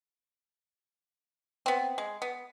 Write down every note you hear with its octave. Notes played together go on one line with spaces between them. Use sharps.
B3 C4
G#3
B3